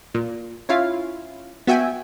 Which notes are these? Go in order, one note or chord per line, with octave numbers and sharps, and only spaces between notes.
A#2
C#4 E4 F4 F5
B3 F#4 E5 G5 G#5